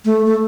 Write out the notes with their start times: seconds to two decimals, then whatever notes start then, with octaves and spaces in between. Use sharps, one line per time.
0.05 A3
0.26 A3